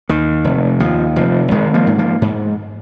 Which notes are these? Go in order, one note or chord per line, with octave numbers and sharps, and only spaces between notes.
D#2 D#3
F1
D#2 F3
F1 F3
G#1 D#3 G#3
F3 A#3
G#2
F3 A#3
G#2